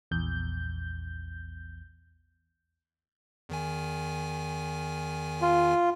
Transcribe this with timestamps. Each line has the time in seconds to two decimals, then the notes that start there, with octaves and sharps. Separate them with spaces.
0.11 A#1 E2 G6
3.49 E2 D#3 G#5
5.42 F4